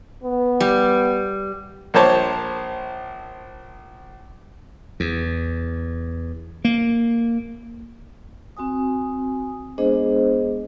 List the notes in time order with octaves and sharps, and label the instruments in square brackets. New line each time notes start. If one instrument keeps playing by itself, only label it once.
[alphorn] B3
[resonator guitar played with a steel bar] G3
[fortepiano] A#1 F3 A#3 C5 C#5 A5
[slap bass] E2
A#3
[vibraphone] C4 F#4 G#5 D#6
G#3 B3 D4 G#4 C5 D#5